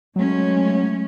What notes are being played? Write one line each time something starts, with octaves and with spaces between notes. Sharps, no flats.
F#3 G#3 A3 C#4